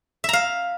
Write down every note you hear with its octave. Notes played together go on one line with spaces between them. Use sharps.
E5 F5 A#5